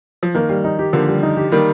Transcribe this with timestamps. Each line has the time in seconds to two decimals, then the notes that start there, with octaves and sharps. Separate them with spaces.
0.23 F3
0.35 D#3 A#3
0.49 G3
0.64 D#4
0.79 G4
0.93 D3 F3 A#3
1.08 G3
1.23 D#4
1.37 G4
1.52 D#3 G3 A#3